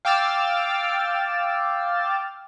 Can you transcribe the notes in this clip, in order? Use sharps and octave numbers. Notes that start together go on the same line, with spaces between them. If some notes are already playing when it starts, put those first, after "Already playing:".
F5 G5 D6 E6 F6 A6